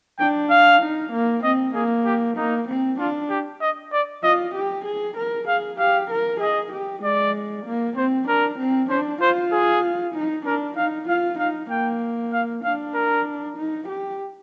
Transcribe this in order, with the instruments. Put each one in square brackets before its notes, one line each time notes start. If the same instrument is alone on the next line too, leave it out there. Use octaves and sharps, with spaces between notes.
[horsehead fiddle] D4 [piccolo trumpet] G5
[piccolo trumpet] F5
[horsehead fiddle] D#4
A#3
[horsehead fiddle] C4 [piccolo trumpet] D#5
[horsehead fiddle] A#3 [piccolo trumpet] G#4
[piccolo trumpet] G4
[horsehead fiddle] A#3 [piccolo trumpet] D#4
[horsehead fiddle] C4
[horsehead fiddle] D4 [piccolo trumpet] F4
[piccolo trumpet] G4
D#5
D5
[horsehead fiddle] F4 [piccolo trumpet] D#5
[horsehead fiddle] G4
G#4
A#4
[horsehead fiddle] G#4 [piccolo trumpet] F5
[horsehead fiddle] G4 [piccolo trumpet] F5
[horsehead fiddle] A#4
[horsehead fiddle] G#4 [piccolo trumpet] D#5
[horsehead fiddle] G4
[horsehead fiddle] G#3 [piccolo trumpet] D5
[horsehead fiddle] A#3
[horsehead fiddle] C4 [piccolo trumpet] C5
[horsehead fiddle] D4 [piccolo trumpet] A#4
[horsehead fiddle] C4
[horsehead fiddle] D4 [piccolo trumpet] C5
[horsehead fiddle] F4 [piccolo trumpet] C5
[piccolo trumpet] G#4
[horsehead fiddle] D#4
[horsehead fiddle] D4 [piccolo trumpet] A#4
[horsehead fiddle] D#4 [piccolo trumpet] F5
[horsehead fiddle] F4 [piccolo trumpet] F5
[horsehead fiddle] D#4 [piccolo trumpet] F5
[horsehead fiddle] A#3 [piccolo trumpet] G5
[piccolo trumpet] F5
[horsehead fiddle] D4 [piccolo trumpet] F5
[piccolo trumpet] A#4
[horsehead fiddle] D#4
G4